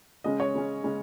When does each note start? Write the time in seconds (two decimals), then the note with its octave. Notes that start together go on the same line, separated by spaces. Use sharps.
0.24 C#3 G#3 C#4 D#5
0.40 C#5
0.54 C#3 G#3 C#4
0.84 C#3 G#3 C#4